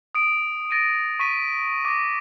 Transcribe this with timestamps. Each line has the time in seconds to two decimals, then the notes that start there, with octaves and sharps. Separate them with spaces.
0.15 D#6 D7
0.70 A6 A#6 D7 D#7
1.20 C#6 B6 D#7
1.85 D6 A#6